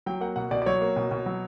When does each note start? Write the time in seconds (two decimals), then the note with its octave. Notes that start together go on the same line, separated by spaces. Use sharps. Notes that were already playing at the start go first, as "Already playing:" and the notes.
0.06 F#3 G5
0.21 A#3 F#5
0.36 B2 F#5
0.51 B2 D5
0.62 D5
0.66 F#3 C#5
0.81 A#3
0.96 B2
1.11 B2
1.26 F#3